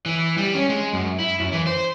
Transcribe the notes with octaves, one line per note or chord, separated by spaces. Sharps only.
E3
G3
C#4
G#3
F#2
E4
F#2
E3
C5